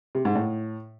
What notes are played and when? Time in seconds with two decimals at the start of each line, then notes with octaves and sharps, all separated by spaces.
0.15 C3
0.25 G#2
0.35 A2